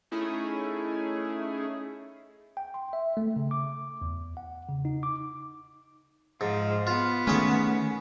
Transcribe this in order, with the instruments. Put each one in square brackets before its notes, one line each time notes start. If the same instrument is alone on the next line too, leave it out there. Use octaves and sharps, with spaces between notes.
[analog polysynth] A3 C#4 D#4 E4 G#4
[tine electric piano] G5
C6
E5
A3
C#3
D6
E2
F#5
C#3
D#4
D6
[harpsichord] G#2 [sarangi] F3
[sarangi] B3 [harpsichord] F4
[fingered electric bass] D#3 A3 [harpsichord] C#4 G#4